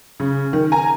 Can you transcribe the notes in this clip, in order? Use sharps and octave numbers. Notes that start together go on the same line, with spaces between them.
C#3
D#3
G#5 A#5